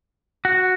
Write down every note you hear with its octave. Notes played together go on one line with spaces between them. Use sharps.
F#4